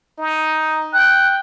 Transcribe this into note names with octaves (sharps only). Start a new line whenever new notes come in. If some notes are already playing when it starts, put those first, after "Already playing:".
D#4
G5 F#6